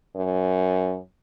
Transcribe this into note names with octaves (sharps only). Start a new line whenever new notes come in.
F#2